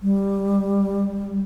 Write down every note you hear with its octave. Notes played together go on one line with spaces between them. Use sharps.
G3